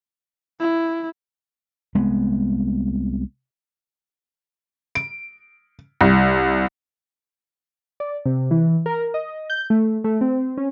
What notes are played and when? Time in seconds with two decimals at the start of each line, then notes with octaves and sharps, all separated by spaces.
0.60 E4
1.95 C2 G#3 B3
4.95 D7
6.01 C2
8.00 D5
8.26 C3
8.51 E3
8.86 A#4
9.14 D#5
9.50 G6
9.70 A3
10.04 A3
10.21 C4
10.57 C#4